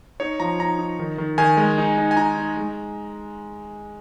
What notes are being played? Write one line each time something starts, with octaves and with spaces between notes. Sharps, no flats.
D#4 C#5
F3 A#5
D#4 A#5
D#4
D#3
D#3
D#3 G#5
G#3
D#4
D#4
G#5
D#4 A#5
D#4
G#3